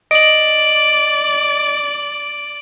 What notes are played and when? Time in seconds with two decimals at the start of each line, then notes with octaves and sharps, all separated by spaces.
0.11 D5 D#5 D7 F#7